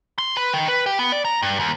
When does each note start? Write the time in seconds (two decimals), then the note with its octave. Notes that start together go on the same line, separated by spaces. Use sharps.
0.18 C6
0.37 B4
0.54 D#3
0.68 B4
0.86 G4
0.99 B3
1.12 D5
1.25 A#5
1.42 G2
1.60 D#2